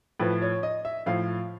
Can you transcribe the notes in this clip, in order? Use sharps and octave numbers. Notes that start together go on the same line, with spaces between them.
A2 F3 B4
C#5
D#5
E5
A2 F3 F5